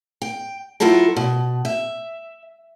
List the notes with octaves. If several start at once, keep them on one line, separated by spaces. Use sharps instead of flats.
G5
F#3 E4 F4 A4 A#4
B2
E5